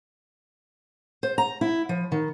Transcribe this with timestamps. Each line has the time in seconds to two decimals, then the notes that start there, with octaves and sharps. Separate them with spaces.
1.23 C5
1.38 A#5
1.61 E4
1.89 F3
2.12 D#3